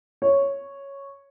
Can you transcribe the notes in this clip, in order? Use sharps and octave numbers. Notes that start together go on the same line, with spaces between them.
C#5